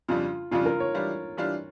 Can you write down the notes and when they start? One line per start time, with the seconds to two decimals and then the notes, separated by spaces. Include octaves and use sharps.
0.08 F2 C#3 G3 D4 F4
0.51 F2 C#3 G3 D4 F4
0.66 A#4
0.80 C#5
0.94 E3 G3 D4 F4
1.37 E3 G3 D4 F4